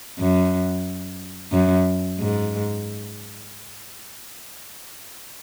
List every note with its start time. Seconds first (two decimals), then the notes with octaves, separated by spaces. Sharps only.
0.19 F#2
1.52 F#2
2.19 G#2